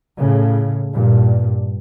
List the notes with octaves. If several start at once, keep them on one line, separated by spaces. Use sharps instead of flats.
A2 C#3
G2 A#2